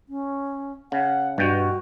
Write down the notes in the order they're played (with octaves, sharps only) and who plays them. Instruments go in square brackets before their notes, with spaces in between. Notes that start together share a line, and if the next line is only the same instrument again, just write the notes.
[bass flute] C#4
[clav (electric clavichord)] C#3 [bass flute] F#5
[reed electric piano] G2 [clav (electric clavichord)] B2 G5 [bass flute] F#4